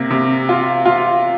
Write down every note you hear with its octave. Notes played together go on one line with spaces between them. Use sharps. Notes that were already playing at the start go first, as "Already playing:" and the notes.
Already playing: C3 A#3
C3
F4
F4